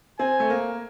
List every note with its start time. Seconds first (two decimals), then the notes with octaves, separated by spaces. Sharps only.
0.19 C4 G#5
0.40 A3
0.50 A#3